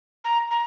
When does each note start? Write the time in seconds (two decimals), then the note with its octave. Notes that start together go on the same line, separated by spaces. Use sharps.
0.24 A#5
0.51 A#5